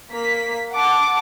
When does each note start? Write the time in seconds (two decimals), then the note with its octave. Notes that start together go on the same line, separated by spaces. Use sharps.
0.11 A#3 B6
0.74 F#5 A5 D6